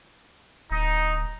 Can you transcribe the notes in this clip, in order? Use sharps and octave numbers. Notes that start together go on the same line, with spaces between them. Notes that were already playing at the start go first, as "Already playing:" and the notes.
D1 D#4